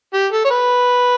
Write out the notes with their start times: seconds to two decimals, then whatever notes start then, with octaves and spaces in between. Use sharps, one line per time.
0.13 G4
0.32 A4
0.44 C#5
0.50 B4